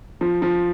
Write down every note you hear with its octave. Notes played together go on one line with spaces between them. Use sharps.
F3
F3